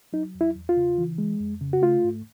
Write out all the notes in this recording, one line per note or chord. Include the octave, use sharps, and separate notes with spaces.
F#3 D#4
E2
E4
E2
F4
C#3
E3
G#3
F2
C#3
F#4
A3 F4
G#2